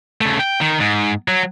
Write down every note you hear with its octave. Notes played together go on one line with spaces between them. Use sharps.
C#3 A3
G5
D#3
G#2
F#3